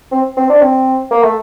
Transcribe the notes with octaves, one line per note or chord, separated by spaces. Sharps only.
C4
C4
D4
C4
A#3
A3